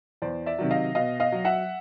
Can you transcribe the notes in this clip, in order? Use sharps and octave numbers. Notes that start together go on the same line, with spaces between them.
E2 C5 D5
D5 E5
C3 D#3 F#3
D#5 F5
B2 D#5 F5
D#5 F5
F#3
E5 F#5